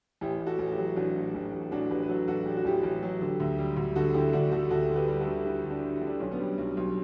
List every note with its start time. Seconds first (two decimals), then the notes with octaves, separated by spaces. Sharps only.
0.21 A1 E4 G4
0.41 A1
0.46 F#4 A4
0.59 A1
0.72 E4 G4
0.78 F#3
0.96 A1 D4 F#4
1.16 A2
1.35 A1
1.52 A1
1.71 A1 D4 F#4
1.90 A1 G4 B4
2.02 B4
2.08 F#3 F#4 A4
2.27 A1 F#4 A4
2.46 A1 G4
2.57 F#4
2.65 A1 E4 G4
2.83 A1
3.03 F#3
3.21 D3
3.40 D2
3.58 G3
3.77 D2
3.96 D3 F#4 A4
4.14 D3 E4 G4
4.33 D2 D4 F#4
4.51 D3 F#4 A4
4.70 D2 F#4 A4
4.89 D3
4.95 G4 B4
5.08 G3
5.20 F#4 A4
5.27 D3
5.45 D3 E4 G4
5.64 D3
5.70 D4 F#4
5.83 D3
5.96 E4
6.02 D3
6.07 D4
6.20 B1 C#4
6.31 B3 D4
6.39 G3
6.58 B1
6.77 B1